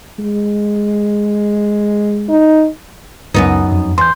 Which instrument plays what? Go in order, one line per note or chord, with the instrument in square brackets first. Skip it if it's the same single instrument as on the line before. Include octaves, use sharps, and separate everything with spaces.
[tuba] G#3
[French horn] D#4
[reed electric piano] C#2 [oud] F#2 B3 D#4
[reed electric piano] F2
[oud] E2 [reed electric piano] C6 G6